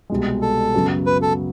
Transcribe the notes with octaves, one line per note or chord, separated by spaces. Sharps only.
C2 B2 G#3
A4
F#2 C#3 F#3 B3
B4
A4